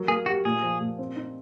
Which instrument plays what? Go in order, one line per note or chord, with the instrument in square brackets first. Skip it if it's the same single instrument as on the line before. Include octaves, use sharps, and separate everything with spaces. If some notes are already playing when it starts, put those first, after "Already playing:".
Already playing: [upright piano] F#3 A#4
[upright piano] A#3 [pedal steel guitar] G#4
[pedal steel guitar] F#4 [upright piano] G4
[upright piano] A#2 [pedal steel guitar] G#4
[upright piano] F3
A#2
C4
D#4